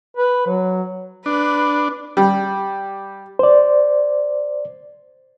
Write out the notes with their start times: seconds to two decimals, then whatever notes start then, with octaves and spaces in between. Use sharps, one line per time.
0.17 B4
0.47 F#3
1.26 D4 B4
2.17 G3
3.39 C5 D5